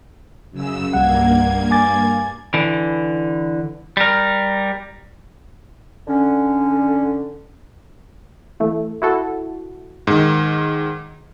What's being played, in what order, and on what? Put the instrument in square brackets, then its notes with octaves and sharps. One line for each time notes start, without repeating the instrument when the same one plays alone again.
[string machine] F#2 C#3 E6
[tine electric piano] C2 G3 F#5 [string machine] G2 A#3 G#6
[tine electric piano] G#5 D6 A6
[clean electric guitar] D3 E3
G3 A#4
[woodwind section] D3 C#4
[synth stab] E3 A3
E4 F#4 A4
[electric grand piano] G#2 D#3